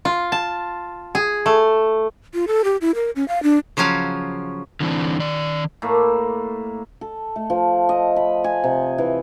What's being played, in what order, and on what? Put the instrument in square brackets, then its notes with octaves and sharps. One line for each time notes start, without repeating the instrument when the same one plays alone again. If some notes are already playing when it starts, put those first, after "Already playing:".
[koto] F4
A5
G#4
A3
[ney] F4
A4
G4
E4
A#4
C#4
F5
D4
[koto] C#3 F3 F#3 C#4 F5
[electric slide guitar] D3 E3 C4 D4
D#3 D5
[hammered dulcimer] A2 A#3
A4
A3
F3
D#5
B5
G#5
C3
E3